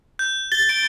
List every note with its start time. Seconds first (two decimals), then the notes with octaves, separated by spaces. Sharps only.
0.19 G6
0.52 A6 G7
0.69 D7